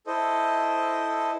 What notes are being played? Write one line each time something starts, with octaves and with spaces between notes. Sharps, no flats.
E4 A4 C5 D#5